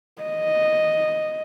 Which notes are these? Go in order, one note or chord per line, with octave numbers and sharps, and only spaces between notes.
D#5